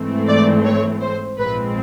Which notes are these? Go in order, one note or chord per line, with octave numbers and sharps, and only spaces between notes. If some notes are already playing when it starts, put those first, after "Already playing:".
Already playing: G#2 E3 A3 C4
D5
C#5
C5
A#1 G#2 F3 G#3 C4 B4